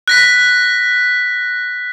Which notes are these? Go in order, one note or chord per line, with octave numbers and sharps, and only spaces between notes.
F#6 A#6 B6